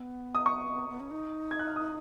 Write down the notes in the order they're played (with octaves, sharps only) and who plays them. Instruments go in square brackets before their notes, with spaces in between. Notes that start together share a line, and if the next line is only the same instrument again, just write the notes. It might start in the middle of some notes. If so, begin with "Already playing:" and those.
Already playing: [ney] B3
[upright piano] D#6
C#6
[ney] B3
C#4
D#4
[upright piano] G#6
F#6
F6
D#6